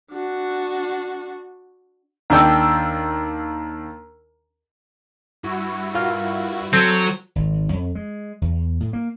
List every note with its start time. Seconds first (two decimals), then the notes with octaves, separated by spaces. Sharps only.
0.12 D4 F#4
2.30 D#2 D4 G5 E6
5.43 G2 E4 F#4
5.95 F4 A#4 F5
6.73 F#3 C4 A4 C5
7.35 G#1
7.73 F2
7.95 G#3
8.41 E2
8.80 A2
8.93 A#3